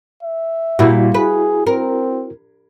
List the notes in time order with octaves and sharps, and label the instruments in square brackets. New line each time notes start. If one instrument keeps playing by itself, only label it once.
[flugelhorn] E5
[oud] A#2 G3 [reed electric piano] E4 F#4
[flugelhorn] G#4 [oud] B4
[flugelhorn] C4 [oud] A#4